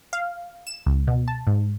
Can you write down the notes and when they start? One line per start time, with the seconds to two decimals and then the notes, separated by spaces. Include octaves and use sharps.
0.13 F5
0.67 E7
0.86 C#2
1.07 B2
1.28 A5
1.47 G#2